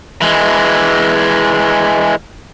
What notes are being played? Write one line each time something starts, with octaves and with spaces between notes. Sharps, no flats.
E3 G#3